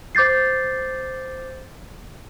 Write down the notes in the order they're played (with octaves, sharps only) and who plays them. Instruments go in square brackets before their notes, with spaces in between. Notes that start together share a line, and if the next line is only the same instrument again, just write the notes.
[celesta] C5 D6 G6 A6 C7